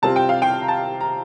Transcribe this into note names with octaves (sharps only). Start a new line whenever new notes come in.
C3 G3 C4 F4 A5
G5
F5
G5
A#5
A5
A#5